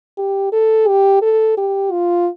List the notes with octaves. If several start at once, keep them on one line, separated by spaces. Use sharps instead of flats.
G4
A4
G4
A4
G4
F4